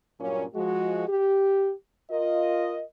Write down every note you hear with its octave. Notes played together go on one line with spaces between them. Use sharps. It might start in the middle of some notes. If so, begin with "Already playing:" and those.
G2 A#2 F#3 A#3 C#4
F3 G#3 F#4
G4
F4 A#4 D#5